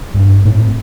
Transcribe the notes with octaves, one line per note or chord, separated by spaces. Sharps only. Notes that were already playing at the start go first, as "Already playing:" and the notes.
G2
A2 C4